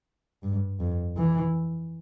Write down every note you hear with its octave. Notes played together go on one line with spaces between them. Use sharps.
G2
F2
E3